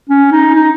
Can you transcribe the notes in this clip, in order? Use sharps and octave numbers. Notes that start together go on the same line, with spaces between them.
C#4
D#4
D#4